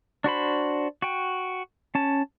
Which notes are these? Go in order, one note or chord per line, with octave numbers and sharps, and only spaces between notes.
D4 F#4 C5 B5
F#4 G5
C#4 A5